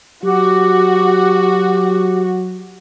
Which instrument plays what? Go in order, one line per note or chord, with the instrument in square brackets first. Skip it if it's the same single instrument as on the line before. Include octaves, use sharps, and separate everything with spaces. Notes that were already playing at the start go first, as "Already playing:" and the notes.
[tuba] F#3 [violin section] F#4 [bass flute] G4